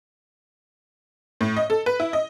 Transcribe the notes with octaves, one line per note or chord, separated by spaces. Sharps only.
A2
D#5
A4
B4
E4
D#5